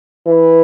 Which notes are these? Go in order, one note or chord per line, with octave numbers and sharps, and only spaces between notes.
E3